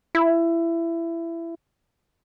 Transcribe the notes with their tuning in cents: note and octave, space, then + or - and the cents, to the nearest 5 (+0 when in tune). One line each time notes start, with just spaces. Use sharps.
E4 +20